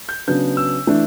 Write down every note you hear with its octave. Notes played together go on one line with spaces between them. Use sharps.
G6
C#3 F#3 B3 D4 G6
E6
E3 A3 D4